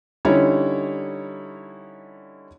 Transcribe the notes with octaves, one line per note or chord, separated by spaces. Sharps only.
D3 G3 C#4 D#4 E4 C#5